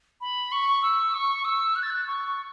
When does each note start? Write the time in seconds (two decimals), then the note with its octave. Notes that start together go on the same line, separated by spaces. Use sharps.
0.21 B5
0.52 C#6
0.82 E6
1.14 C#6
1.45 E6
1.76 F#6
1.83 A6
1.90 F#6
2.07 C#6